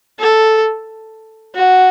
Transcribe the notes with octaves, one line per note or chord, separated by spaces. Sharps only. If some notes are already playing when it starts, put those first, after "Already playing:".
A4
F#4